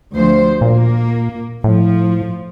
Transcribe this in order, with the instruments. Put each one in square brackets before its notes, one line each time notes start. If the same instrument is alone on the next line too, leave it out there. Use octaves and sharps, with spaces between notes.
[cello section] D2 F3 C5
[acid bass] A#2 [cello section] A#3
[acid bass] A2 [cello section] F3